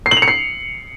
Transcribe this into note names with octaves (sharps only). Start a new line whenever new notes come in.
C7
F#7
F7
C#7
C7